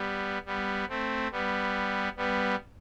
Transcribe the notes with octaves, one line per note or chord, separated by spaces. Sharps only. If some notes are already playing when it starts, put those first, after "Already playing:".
Already playing: G3 B3
G3 B3
A3 C4
G3 B3
G3 B3